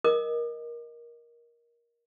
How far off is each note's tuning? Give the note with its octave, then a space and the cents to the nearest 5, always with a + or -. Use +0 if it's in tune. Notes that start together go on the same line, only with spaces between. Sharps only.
A#4 +15 D#5 +0 D6 +40